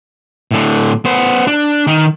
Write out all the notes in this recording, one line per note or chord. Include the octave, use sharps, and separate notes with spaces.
A2 D3
B3 C5
D4
D#3